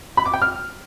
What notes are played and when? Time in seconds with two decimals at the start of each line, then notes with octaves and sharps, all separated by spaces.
0.17 B5
0.25 D6
0.34 G5
0.42 F6